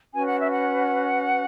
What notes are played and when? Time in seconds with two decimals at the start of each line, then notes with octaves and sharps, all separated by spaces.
0.14 C#4 F#4 B4 G#5
0.26 F#5
0.39 E5
0.50 F#5